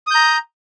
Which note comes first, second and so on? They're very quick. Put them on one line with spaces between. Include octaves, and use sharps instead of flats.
D#6 G6 A#5